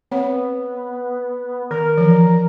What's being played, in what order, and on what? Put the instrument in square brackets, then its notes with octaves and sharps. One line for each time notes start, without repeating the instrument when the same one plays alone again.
[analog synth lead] B3 [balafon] C4 C#5
[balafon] D#3 [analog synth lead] A#4
[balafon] E3 F3